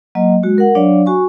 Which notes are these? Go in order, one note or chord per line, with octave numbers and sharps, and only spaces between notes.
F#3 A#3 D#5
G#3 F#4
A#4 F#5
F#3 D4 C#5 D5 F5
F#4 G#5 C#6